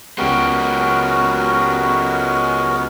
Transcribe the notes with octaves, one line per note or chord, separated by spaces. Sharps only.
C#2 G#3 B3 C#4 F#4 G4 A#4